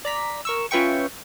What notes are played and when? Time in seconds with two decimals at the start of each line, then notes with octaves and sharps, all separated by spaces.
0.05 D5 A#5 B6
0.45 A#4 C#6 E6
0.71 C#4 F4 B4 E5 G5 C#6